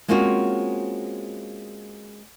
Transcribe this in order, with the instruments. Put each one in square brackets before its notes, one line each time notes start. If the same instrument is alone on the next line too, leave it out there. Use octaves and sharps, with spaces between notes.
[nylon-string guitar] G#3 A#3 C4 C#4 F4 F#4